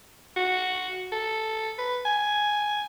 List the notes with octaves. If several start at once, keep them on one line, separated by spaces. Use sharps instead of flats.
F#4
A4
B4
G#5